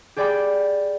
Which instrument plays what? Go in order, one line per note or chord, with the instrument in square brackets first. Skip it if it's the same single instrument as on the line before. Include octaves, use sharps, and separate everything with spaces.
[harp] G4 G#4 D5 G5 B5 D6